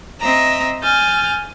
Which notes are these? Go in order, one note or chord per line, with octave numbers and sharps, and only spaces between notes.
C4 D#5 E5 A#5
G#5 F6 G6 A6